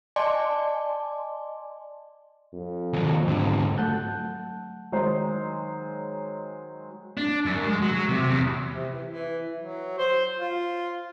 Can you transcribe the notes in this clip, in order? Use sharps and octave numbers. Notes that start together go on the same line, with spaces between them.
D5 D#5 G#5 A5 C6 D6
F2
D#2 F#3
G#2 D3
F#3 A3 F#5 A5 F#6 G6
D#3 F#3 G#3 D#4 C5
D4
F#2
G#3
F#3
C3
E2
C3
E3
E3
F#3
C5
F4